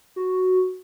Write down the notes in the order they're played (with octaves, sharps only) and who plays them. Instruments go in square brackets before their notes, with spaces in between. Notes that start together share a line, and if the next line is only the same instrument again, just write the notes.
[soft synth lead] F#4